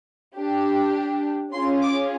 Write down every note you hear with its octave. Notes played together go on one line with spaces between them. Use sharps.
D4 G4
C#4 F4 G#4 C6
D6